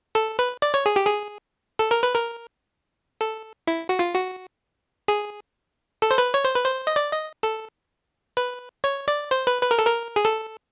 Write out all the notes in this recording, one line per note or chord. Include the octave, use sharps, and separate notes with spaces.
A4
B4
D5
C#5
G#4
G4
G#4
A4
A#4
B4
A#4
A4
E4
F#4
F4
F#4
G#4
A4
C5
B4
C#5
C5
B4
C5
D#5
D5
D#5
A4
B4
C#5
D5
C5
B4
B4
A#4
A4
A#4
G#4
A4